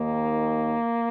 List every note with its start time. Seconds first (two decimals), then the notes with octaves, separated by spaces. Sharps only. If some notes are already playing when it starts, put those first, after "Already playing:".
Already playing: D#2 D#3 A#3